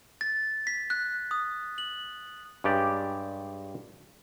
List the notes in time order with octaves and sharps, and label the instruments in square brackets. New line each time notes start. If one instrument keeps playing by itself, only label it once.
[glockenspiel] A6
B6
F#6
D#6
F#7
[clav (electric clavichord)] G2 G#3 C#4 G4 D5